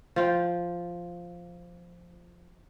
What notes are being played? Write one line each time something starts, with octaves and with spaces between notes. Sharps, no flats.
F3 F4 G5